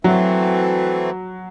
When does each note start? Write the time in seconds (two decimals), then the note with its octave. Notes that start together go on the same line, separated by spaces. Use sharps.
0.04 E3 F#3 A3 C4